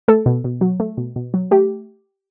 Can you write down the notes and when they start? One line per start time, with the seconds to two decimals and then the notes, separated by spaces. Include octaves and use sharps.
0.08 A3 A4
0.26 B2
0.44 B2
0.61 F#3
0.80 A3
0.97 B2
1.16 B2
1.34 F#3
1.51 A3 G4